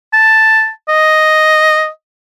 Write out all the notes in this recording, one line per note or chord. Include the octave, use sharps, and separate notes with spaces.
A5
D#5